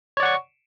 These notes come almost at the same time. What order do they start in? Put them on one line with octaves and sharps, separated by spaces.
C#5 D5 F#5 C#6